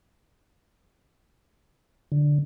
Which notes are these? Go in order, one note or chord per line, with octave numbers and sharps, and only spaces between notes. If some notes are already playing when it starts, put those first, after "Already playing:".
D3